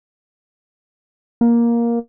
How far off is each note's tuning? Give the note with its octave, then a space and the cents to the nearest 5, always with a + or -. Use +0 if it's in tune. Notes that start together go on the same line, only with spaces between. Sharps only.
A#3 +10